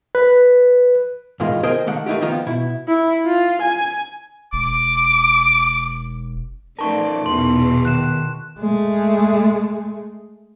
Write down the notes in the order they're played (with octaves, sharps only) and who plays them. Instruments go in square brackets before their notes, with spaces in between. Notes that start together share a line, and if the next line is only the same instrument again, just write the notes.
[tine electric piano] B4
[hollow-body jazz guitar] C#2 A2 D#3 E3 G#3 F4
G#4 A#4 C5 D#5 G5 G#5
D#3 A3 A#3 F#5
A3 A#3 D#4 E4 G4
D#3 F3 A#3 B3 D#4 F4
B2 E4
[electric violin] E4
F4
G#5
[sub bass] E1 [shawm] D6
[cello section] F3 A3 D5 [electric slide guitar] C#4 D#4 A#4 [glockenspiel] A5 C#6
[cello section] E2 B2 E3 [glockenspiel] C6
[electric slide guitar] D#3 [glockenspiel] F#6 E7
[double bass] G#3 A3